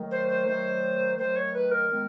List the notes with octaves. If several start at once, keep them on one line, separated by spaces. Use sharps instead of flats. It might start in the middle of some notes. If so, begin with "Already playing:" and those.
Already playing: D#3 F#3 A3
C5
C5
D#3 F#3 A3 C5
D#3 F#3 A3 C5
C#5
B4
A#4
D#3 G#3 B3